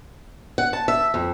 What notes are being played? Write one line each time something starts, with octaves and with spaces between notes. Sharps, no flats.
F#5
A5
E5
F2